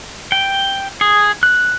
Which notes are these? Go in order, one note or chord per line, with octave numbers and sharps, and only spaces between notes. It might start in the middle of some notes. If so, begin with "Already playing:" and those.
G5
G#4
F#6